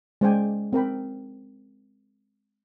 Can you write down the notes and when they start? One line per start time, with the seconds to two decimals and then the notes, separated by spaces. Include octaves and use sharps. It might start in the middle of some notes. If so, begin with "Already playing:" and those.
0.21 G#3 C#4 C5 D5 G5 G#5
0.73 C4 A#4 G5 B5